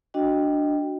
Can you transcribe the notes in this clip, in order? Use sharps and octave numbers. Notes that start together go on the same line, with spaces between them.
D4 F#4 D#5 G5